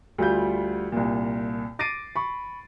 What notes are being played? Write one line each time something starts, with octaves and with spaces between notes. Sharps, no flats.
D2 G3 F4 G6
C2 A#2
D6 A6 A#6 C7 D7 D#7
B5 C#6